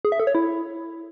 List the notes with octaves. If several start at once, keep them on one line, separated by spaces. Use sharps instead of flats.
G#4
E5
A4
C#5
E4